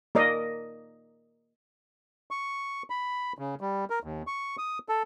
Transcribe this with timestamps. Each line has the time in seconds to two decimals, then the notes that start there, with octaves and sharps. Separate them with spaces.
0.15 A#3 A#4 D5 D#5
2.31 C#6
2.90 B5
3.39 C#3
3.61 G3
3.90 A#4
4.04 D#2
4.27 C#6
4.58 D#6
4.89 A4